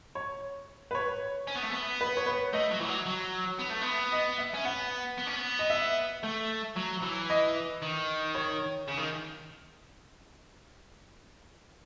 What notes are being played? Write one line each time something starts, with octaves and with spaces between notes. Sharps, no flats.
C#5
B4
C#5
C#4
B3
A3
B3
B4
C#5
B4
A3 D#5
F#3
E3
F#3
F#3
B3
A3
B3
D#5
E5
C#4
B3 F#5
B3
C#4
B3
D#5
E5
A3
F#3
E3
D#5
D#3
C#5
C#3
D#3